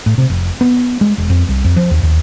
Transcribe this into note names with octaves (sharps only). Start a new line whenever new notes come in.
A2
C3
F1
B3
G#3
E1
F2
C2
F2
F3
D#2
D#2